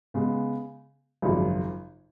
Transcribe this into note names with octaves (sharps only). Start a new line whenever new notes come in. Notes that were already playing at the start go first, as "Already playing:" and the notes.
C#3 G#3 B3
G#1 F#2 C#3 F3